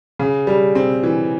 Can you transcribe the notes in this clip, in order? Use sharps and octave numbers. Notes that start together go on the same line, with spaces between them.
C#3
G3
C4
E3